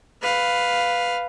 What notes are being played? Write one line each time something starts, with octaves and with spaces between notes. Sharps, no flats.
B4 F5